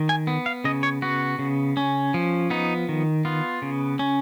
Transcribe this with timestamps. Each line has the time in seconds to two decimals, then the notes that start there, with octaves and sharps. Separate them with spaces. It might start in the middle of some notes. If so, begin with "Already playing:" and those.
Already playing: D#3
0.09 G#5
0.27 B3
0.46 F5
0.64 C#3 D#5
0.83 C#5
1.02 B3 F#4
1.39 C#3
1.77 C#4
2.14 F3
2.50 B3 D#4
2.89 D#3
3.25 B3 F4
3.62 C#3
3.99 C#4